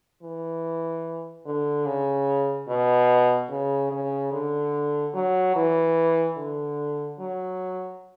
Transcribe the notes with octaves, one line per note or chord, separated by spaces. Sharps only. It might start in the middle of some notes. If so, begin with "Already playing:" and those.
E3
D3
C#3
B2
C#3
C#3
D3
F#3
E3
D3
F#3